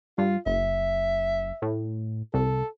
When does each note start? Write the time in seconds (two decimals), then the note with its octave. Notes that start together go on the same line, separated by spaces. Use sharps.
0.18 G2 F4
0.46 F#1 E5
1.62 A2
2.34 C2 A4